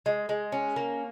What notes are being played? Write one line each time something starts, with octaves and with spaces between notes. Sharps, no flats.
G#3
G#3
C#4
A#3